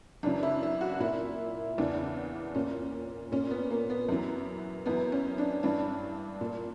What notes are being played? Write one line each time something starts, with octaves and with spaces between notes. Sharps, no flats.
F#2 C#3 E3 D4
E4
E4
F#4
A#2 E4
E2 C#3 E3 D4
A#2 C#4
A#2 C#4
B3
A#3
B3
F#2 E3
F#2 E3 B3
C#4
D4
G2 E3 D4
A#2